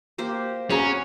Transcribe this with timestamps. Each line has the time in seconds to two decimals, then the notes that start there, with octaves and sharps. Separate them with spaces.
0.18 A#3 G4 C5
0.70 C#4 F#4 G#4 B4 F5 A#5